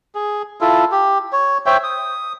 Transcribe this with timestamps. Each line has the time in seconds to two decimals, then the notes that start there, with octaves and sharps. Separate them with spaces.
0.15 G#4
0.61 E4 F4 A4
0.92 G4
1.32 C#5
1.66 C5 C#5 E5 G5
1.84 D#6